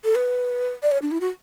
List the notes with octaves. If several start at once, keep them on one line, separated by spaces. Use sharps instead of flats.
A4
B4
D5
C#5
D4
E4
F#4